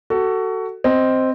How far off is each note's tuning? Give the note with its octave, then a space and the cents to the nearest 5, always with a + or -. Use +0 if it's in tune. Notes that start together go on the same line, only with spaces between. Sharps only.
F#4 +20 A4 +15
C4 +0 D#5 +0